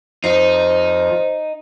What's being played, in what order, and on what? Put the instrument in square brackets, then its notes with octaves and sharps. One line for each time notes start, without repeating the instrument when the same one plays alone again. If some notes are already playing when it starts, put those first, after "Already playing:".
[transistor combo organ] F2 [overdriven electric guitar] D#4 [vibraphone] C5